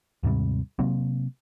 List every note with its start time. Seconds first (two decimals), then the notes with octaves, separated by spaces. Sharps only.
0.23 D#2 G#2 C3 G3
0.79 C3 F#3 A#3 C4